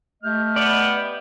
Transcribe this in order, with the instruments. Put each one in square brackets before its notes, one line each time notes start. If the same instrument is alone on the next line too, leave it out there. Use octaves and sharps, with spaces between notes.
[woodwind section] A3 D#5 F6 [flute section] G4 E5 G6
[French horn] B3 [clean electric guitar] D5